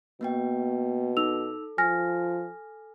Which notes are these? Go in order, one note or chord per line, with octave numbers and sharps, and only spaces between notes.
B2 A#3 B3 G5
D#4 A4 E6 F7
F3 G#5 F6 A#6